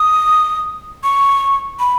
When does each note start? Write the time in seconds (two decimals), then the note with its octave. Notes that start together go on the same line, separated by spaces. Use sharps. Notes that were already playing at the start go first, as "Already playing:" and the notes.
Already playing: D#6
1.03 C#6
1.79 B5